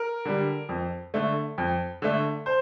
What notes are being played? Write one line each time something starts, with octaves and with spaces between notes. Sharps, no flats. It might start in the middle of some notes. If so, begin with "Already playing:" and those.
Already playing: A#4
D3 G3
F2
D3 A3
F2
D3 A3
C5